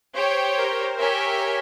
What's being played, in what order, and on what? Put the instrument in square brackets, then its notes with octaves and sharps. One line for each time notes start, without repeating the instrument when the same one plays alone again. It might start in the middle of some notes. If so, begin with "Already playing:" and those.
[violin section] G4 C#5 G5 [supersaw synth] C5
[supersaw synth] A#4
[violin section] G4 C#5 E5 G#5 [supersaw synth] A#4